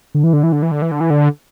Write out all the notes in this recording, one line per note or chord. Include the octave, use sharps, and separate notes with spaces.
D3
E3
D3
E3
D3
E3
D3
E3
D3
E3
D3